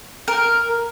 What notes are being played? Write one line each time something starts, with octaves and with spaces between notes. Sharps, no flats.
A#4